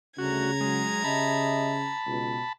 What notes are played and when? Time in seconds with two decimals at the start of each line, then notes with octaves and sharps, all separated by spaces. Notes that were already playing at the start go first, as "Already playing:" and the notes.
0.18 D2 C#3 G3 A3 F#4 A#5 G#6
0.61 F#3 G#3
1.04 C#3 G4 D#5 E5 A5 B5
2.07 C#2 B2